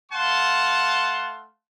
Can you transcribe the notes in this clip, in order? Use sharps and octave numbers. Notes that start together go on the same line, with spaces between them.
A3 F5 F#5 A5 C6